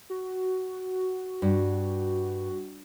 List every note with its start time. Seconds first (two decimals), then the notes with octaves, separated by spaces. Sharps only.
0.10 F#4
1.42 G2